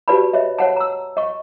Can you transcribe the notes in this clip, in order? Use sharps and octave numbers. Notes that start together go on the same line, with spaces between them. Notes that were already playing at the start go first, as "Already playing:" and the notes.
F#4 G4 B4 D5 A5 B5
C#5 D#5 E5
C#5 F#5 A5
A#5 E6
D#5 C#6